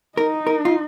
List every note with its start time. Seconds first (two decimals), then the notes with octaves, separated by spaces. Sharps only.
0.17 D#4 A#4
0.47 A#4
0.65 F4